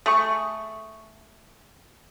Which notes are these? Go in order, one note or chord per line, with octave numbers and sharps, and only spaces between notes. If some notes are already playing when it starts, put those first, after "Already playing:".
A3 G#4 C#6